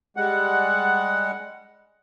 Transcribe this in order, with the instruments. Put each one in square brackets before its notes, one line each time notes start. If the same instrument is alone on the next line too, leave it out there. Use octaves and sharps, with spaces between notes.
[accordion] G3 G#3 F#5